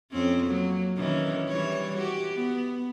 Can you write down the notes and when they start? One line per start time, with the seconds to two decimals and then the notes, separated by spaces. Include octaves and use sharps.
0.11 F2 C4 C#4
0.46 F#3 A#3
0.97 D#3 E3 C#4
1.48 E3 G3 C#5
1.97 F#4 G4
2.34 B3